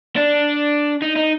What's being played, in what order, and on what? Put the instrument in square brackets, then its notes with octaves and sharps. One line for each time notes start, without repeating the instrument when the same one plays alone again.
[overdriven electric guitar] D4
D#4
D#4